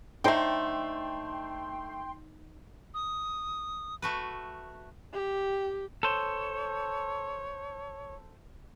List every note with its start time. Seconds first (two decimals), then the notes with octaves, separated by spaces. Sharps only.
0.24 D3 A3 D#4 C5 G5 C6
2.94 D#6
4.02 A3 F#4 B4
5.13 G4
6.03 A4 C5 C#5